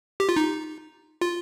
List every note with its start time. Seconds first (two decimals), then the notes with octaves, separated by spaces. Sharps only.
0.20 G4
0.29 F4
0.36 D#4
1.21 F4